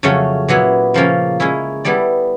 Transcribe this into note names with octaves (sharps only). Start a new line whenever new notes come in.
F2 C#3 F#3 A3 C#4
A#2 F#3 B3 E4
C#3 F3 A#3 C#4
G#3 C#4 E4
G3 B3 E4 A4 D5